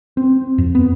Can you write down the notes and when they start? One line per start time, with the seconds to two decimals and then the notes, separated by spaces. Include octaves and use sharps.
0.17 C4
0.58 F2
0.75 B3